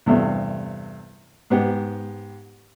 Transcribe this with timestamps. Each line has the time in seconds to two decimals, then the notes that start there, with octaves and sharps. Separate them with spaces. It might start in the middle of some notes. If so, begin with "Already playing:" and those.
0.06 E2 G2 C3 A3
1.50 G#2 B3 G4